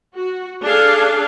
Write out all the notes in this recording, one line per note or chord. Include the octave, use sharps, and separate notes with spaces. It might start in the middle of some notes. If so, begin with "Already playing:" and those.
F#4
D4 G#4 A4 F5